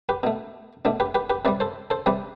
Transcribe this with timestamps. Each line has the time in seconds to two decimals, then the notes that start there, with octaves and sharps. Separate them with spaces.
0.09 G4 B4
0.23 B2 A3
0.85 B2 A3 D4
1.00 G4 B4
1.15 G4 B4
1.30 G4 B4
1.45 C3 G3 B4 D5
1.60 A4 C5
1.90 A4 C5
2.06 C3 G3 B4 D5